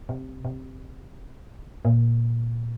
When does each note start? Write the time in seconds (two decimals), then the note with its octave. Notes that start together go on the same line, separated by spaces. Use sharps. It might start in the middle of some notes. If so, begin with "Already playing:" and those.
0.09 C3
0.45 C3
1.85 A#2